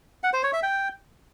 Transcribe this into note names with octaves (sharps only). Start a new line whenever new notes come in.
F#5
C5
C#5
E5
G5